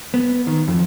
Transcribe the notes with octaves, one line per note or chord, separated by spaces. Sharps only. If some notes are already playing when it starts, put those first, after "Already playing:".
B3
D#3
F2